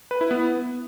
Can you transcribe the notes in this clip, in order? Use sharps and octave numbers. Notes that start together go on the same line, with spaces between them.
B4
E4
B3